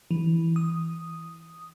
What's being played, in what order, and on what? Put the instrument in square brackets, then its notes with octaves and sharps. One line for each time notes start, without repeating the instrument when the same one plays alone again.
[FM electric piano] E3
D#6